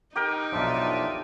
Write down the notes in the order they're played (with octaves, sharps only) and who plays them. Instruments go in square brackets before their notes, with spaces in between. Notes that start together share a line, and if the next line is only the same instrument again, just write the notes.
[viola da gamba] D#4 [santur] G4 A#4 G5
[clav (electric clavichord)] B1 F2 [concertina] D4 F4 E5